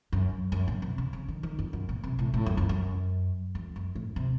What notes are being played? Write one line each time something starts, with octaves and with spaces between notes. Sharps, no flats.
F#2
F#2
A#2
C3
C#3
C#3
D#3
D#3
F2
F#2
A#2
C3
A2
A2
F#2
F2
F#2
F2
F#2
A2
C3